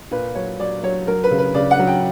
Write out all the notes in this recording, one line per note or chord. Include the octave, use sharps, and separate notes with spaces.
A#2 B4
F#3 C#5
F#3 D5
F#3 C#5
F#3 A#4
B4
C#3
B4
C#3 D5
F#5
F#3
G5